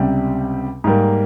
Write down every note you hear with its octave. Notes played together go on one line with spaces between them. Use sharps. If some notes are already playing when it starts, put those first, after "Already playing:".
Already playing: C#2 C3 G3
G#2 G3 A#3